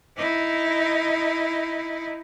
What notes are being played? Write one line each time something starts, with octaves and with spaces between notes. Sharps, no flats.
D#4 E4